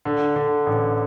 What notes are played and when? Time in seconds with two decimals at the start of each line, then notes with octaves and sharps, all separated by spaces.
0.05 D3
0.36 D3
0.66 A1